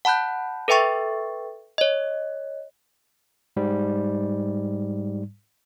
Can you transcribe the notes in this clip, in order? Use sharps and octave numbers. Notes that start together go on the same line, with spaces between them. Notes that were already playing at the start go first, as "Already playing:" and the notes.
F#5 A5 B5 F#6 G6
A4 B4 E5 G5 C#6 A6
C#5 D#5
G#2 G3